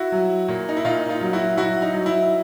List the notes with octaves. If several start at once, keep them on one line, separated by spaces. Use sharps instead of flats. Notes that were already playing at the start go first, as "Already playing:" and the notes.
Already playing: E4 F#4
F#3
A#2
D#4
E4
A#2 D#4 F4
D#4 F4
F#3
E4 F#4
F#3 E4 F#4
D#4
F#3
E4